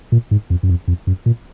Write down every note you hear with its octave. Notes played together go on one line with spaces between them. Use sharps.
A#2
G#2
F2
F#2
F2
F2
F#2
A#2